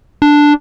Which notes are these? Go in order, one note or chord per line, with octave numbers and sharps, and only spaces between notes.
D4